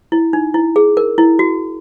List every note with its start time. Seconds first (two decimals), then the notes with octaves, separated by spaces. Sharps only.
0.12 E4
0.33 D#4
0.54 E4
0.76 G#4
0.97 A#4
1.18 E4
1.39 F#4